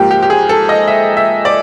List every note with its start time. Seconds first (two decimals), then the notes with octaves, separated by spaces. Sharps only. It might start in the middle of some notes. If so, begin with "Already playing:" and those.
Already playing: G#2 F3 A#3 G4
0.11 G4
0.23 G4
0.30 G#4
0.49 A4
0.69 D#5
0.88 E5
1.17 E5
1.45 D5